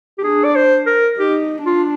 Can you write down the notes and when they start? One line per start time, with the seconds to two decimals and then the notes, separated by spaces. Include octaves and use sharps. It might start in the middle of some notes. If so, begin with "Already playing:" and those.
0.18 G4
0.23 D4 G#4
0.44 D5
0.55 C5
0.86 A#4
1.18 D#4 G4
1.66 D4 F4